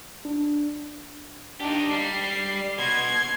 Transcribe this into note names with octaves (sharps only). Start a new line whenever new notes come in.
D4
D4 D#4 G4
G3 C7
B2 C6 G#6